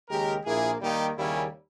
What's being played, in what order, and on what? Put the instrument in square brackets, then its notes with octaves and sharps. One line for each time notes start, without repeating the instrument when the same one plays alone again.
[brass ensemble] D#2 C#3 G#3 G4 A#4
A#1 A#2 A#3 E4 G#4
D#2 D#3 G3 A#3 D#4 G4
D#2 C#3 G3 A#3 C#4 E4